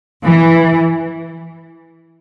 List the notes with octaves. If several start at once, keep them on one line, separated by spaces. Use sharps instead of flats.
E3